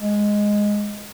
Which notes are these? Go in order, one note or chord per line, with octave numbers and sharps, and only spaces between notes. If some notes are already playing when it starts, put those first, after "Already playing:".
G#3